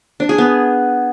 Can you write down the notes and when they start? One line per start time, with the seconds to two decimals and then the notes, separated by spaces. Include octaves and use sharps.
0.20 D4
0.29 G#4
0.38 B3